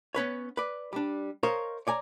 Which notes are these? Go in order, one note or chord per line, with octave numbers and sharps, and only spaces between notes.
B3 C#4 B4 C#5
B4 D5
G3 D4
A#4 C5 C#5 D#5 F5
C#5 D5 G#5 A#5